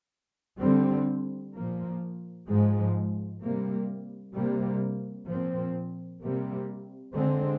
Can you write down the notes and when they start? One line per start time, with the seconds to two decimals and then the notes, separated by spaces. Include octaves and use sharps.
0.60 D3 G3 C4
1.53 A#2 F3 A#3
2.47 G#2 F3 G#3
3.40 C3 G3 A#3
4.34 C3 G3 A#3
5.27 A#2 F3 C4
6.21 C3 G3 A#3
7.14 D3 G#3 C4